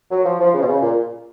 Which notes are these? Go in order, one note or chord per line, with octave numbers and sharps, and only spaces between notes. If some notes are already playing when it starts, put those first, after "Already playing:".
F#3
F3
F3
C#3
B2
C#3
A#2